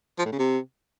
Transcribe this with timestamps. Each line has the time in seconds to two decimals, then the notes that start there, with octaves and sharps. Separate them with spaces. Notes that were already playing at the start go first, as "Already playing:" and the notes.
0.19 F3
0.26 A2
0.32 C#3
0.39 C3